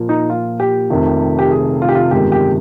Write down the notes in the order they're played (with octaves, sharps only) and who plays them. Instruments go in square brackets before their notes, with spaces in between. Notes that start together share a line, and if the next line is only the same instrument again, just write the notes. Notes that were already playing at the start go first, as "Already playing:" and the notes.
Already playing: [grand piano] A#2 F3 A#3
[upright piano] D#4
F4
G4
[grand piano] F1 F2 C3 D#3
[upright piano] G4
G#4
F4
G4
F4
[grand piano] G1 F2 D#3 G#3 [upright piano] G4
[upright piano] G4